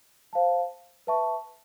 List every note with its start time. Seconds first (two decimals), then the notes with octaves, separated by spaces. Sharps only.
0.33 C5 F5 A5
1.07 B4 E5 A5 C#6